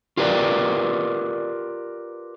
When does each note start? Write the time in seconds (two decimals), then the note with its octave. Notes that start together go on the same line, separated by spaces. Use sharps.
0.17 F4 G4 A#4 B4 D5